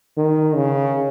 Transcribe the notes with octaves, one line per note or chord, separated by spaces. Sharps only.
D#3
C#3